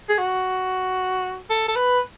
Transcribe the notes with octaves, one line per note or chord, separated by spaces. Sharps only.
G#4
F#4
A4
A4
B4